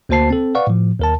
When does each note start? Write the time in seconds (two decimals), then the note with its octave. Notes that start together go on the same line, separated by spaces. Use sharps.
0.09 D2 A#3 F#4 C5 A5 C7
0.30 C4 A4
0.55 B4 D5 F5 F#5 C#6
0.67 A2 F3
0.99 D#2 A#4 A5